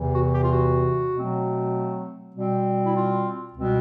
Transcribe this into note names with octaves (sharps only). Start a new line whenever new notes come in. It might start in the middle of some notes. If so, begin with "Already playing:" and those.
Already playing: E2 C3 E3
F#4
G4
F4
F#4
B2 F#3 A3 C4
B2 G3 C4
E4
F4
C#2 B2 G3 C4